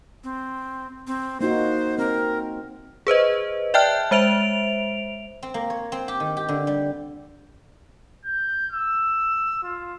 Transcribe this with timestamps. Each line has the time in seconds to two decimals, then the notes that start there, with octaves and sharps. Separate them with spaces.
0.24 C4
1.07 C4
1.41 A#3 D#4 F#4 C5
1.98 C4 A#4
3.07 G#4 B4 C5 D#5
3.74 D5 E5 G5 A5 F6 F#6
4.11 G#3 C5 E5 D7 F7
5.43 C4
5.54 A#3
5.70 C#5
5.92 C4
6.08 G4
6.20 D#3
6.37 G4
6.49 D3
6.67 G3
8.25 G6
8.72 E6
9.63 F4